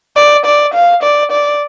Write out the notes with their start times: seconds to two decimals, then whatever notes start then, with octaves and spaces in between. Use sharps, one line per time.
0.16 D5
0.45 D5
0.74 F5
1.03 D5
1.32 D5